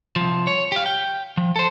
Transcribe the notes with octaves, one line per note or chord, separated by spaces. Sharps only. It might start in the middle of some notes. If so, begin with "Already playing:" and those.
C2 F3
C#5
G4 F5
G5
F3
A4 C5